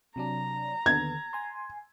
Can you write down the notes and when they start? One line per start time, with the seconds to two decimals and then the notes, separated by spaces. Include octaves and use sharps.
0.16 C3 F#3 D4 A#5
0.86 D#2 D3 B3 G#6
1.33 G#5 C6